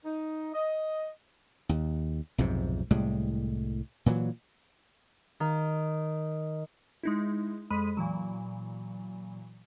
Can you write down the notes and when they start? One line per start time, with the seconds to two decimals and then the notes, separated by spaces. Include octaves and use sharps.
0.05 D#4
0.54 D#5
1.69 D#2
2.38 B1 F2 G#2 C3
2.91 C2 A2 G3 G#3
4.06 A#2 E3 F#3
5.40 D#3
7.03 G#3 D#4 E4
7.70 F2 G#3 B5 B6 D#7
7.97 A#2 E3 F#3